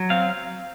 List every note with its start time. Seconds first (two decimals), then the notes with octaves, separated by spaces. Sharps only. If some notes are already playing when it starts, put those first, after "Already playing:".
Already playing: F#3
0.10 C4 F5